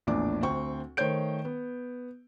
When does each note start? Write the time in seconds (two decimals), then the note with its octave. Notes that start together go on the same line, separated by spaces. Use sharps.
0.07 A#1 E2 A2 D4 D6
0.42 D2 C4 G5 C#6
0.97 D#3 A3 C5 C#5 G6 D7
1.45 B3